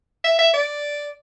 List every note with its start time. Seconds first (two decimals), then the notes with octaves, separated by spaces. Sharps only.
0.24 E5
0.39 E5
0.54 D5